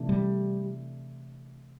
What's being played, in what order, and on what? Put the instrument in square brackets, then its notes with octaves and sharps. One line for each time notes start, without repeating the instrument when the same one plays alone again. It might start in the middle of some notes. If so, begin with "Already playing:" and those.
Already playing: [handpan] C3 E3 A3 D4
[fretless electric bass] G3